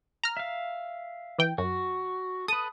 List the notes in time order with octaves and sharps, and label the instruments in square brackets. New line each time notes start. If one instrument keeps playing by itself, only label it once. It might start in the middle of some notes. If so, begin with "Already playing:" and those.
[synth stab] A#5 F6
[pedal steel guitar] E5 F5
[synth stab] E3 G5
[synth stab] F#2 [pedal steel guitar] F#4
[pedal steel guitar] A4 B4 [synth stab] D#6